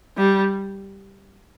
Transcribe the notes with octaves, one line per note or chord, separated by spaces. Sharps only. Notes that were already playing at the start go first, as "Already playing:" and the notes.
G3